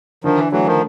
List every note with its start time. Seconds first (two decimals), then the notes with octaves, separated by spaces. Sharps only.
0.24 D3 D#3 F3
0.38 E3
0.52 E3 F#3 A3
0.67 D#3 F3